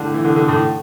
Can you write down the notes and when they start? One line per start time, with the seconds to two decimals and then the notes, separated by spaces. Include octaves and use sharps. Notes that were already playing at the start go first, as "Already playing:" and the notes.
Already playing: A2 D3
0.14 E3
0.25 D3
0.36 D3
0.48 A2